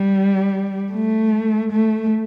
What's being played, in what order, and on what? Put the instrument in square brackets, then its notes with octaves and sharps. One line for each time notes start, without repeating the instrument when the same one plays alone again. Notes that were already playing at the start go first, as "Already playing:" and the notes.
Already playing: [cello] G3
A3
A3